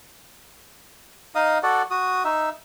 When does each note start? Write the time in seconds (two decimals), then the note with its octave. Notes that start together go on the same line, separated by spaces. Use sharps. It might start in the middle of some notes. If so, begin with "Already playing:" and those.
1.35 D#4 D#5 F5 D#6
1.63 F#4 A4 D5 F#5
1.91 F#4 D#6
2.25 D#4 E5